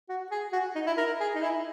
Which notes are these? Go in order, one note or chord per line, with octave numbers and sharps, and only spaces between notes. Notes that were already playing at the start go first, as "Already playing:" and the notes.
F#4
G#4
F#4
D#4
E4
A#4
G#4
D#4
E4